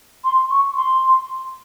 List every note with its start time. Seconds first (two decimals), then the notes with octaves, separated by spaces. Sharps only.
0.24 C6
0.50 C#6
0.76 C6